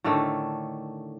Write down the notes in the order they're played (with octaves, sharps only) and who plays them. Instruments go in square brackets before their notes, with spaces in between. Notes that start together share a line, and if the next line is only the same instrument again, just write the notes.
[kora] A2 D3 D#3 A3